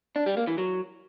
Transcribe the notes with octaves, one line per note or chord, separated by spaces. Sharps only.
D4
G3
A#3
E3
F#3